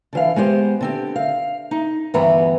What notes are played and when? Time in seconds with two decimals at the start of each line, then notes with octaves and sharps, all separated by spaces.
0.13 D3 E3 F5
0.36 G#3 B3 G4 C5
0.81 D3 C4 G4
1.16 F5
1.71 D#4
2.14 D2 G2 E3 B3 B4 A#5